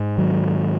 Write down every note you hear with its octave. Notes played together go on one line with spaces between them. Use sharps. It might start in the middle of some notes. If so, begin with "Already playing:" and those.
Already playing: G#2
D#3 F#3